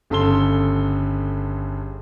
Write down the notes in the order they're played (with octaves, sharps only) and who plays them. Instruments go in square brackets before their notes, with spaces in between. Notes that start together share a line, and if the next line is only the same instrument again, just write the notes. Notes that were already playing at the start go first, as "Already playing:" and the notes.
[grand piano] G1 C#3 A4 C6 G7